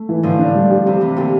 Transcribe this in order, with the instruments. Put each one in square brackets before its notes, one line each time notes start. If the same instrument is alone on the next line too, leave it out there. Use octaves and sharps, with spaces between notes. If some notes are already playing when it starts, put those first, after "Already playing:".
Already playing: [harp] A3
[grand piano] E3
[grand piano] A2 [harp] D3 F3
[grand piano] D4
G3
G4
[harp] C3 E3 [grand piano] C4
[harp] C3 E3 [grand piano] C4
[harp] A#2 D3 [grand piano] G4